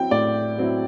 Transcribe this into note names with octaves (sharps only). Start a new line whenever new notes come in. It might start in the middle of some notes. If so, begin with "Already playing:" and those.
Already playing: F#3 C4 E4 G5
A2 D5
F#3 C4 E4